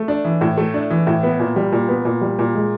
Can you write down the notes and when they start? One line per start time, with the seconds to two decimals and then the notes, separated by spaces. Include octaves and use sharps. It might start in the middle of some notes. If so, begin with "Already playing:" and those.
Already playing: A3
0.08 D4
0.25 E3
0.41 A2
0.58 A3
0.74 D4
0.90 E3
1.07 A2
1.23 B3
1.39 A#2
1.56 G3
1.72 A#2
1.89 B3
2.05 A#2
2.21 G3
2.39 A#2
2.55 G#3